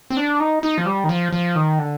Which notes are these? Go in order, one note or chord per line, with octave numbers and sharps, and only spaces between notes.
C4
D4
D#4
D#4
F3
G3
D#3
F3
F3
D#3
D3